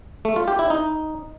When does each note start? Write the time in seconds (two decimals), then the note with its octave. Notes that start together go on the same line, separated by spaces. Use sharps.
0.25 A3
0.36 F4
0.48 G4
0.59 E4
0.70 D#4